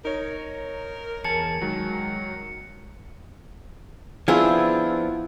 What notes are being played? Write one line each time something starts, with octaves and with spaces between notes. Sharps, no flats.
D#4 A#4 C#5
E2 G#4 A5 C#7
D#3 F#3 G#3
F3 B3 C4 D4 E4 F4 G#4